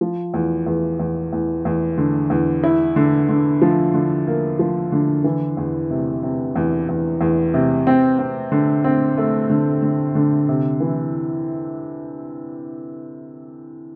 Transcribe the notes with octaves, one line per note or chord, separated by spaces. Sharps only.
F3
E2
E2
E2
E2
E2
D3
E2
E4
D3
D3
F3
D3
A#3
F3
D3
E3
E2
C3
C3
E2
E2
E2
C3
C4
C4
D3
C4
A3
D3
D3
D3
C3
E3